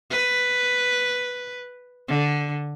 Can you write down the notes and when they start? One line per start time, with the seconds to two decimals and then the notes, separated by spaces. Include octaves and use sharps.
0.11 B4
2.08 D3